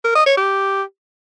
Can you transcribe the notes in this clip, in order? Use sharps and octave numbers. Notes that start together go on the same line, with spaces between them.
A#4
D#5
C#5
G4